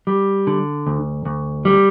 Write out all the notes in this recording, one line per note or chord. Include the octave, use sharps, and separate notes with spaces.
G3
D3
D2
D2
G3